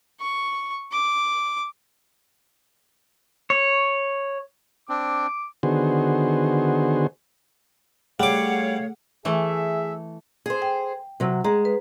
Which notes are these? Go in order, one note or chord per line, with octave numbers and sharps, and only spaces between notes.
C#6
D6
C#5
C4 D4 D6
D3 D#3 B3 F#4 G#4 C5
G3 A3 G#4 C#5 F5 F#5 D6
E3 A3 G#4 E5
G#4 C5
G5
C3 F#3
G#3 G#4 A#5
B4